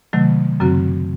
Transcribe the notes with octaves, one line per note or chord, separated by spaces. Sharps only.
C3 D#3 F#3 A3
F#2 C#3 F#3 C4 F#4